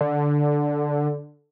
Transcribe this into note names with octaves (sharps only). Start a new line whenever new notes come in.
D3